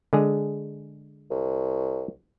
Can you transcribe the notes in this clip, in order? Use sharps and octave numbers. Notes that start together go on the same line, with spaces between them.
D3 G#3 G#4
C2